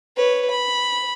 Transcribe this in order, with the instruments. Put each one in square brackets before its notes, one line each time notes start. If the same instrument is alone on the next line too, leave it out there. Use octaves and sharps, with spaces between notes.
[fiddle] B4 C#5
B5